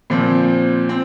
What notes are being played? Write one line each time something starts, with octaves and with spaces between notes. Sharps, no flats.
A#2 F3 C4
C4